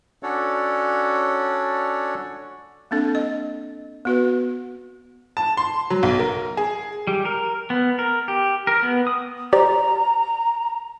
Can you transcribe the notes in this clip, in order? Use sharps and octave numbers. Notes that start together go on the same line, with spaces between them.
C#4 D4 F#4 A4 C#5 D5
A#3 C4 D4 A4
D#5
B3 F#4 B4
A5
C6
F#3
B1
A#4
G#4
G3
A#4
B3
A#4
G4
A#4
B3
D#6
G4 C5 D5 A#5